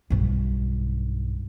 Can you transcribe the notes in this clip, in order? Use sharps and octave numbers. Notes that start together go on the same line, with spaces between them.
B1 G2